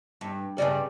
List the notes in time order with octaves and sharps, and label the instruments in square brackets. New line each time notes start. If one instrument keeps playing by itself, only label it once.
[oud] G2
[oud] G2 C#3 G3 [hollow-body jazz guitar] D5 D#5 G#5